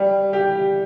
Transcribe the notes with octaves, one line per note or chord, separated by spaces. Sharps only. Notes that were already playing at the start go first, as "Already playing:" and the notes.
Already playing: G3
G4